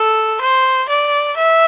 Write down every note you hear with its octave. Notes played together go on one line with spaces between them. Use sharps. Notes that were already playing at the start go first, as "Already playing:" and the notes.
Already playing: A4
C5
D5
E5